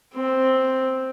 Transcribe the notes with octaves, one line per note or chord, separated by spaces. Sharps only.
C4